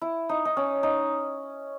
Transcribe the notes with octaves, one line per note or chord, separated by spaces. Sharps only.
E4
D#4
D#4
C#4
D#4